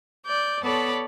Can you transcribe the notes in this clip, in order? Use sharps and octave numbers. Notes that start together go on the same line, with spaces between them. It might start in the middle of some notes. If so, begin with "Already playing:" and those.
D5 G6
B3 A4 C#5 D5 A5 B5